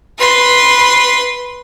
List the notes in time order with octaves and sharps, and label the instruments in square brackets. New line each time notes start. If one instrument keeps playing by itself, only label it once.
[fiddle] B4 C6